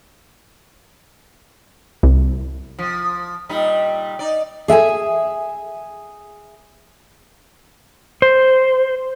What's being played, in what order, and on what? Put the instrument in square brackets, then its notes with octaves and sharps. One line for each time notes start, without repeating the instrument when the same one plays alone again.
[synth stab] C2
[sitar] F3
A#2 G3 D#4
D#4 D5
[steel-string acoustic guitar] G#4 E5 G5 G#5
[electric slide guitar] C5